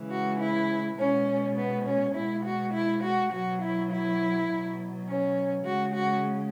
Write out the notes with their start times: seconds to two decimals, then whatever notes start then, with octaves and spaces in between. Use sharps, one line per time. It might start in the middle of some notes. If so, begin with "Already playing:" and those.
Already playing: C#3 E3 G#3
0.10 F#4
0.39 E4
0.97 B2 G#3 C#4
1.56 B3
1.85 C#4
2.14 B2 G#3 E4
2.44 F#4
2.73 E4
3.02 F#4
3.31 B2 F#3 F#4
3.61 E4
3.90 E4
4.48 B2 F#3
5.07 C#4
5.64 C#3 G#3 F#4
5.94 F#4